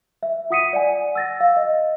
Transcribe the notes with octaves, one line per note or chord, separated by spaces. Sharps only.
E5
F4 F#5 D#6 B6 C#7 D#7
D5 F#5 G#5
E6 A6 A#6
F5
D#5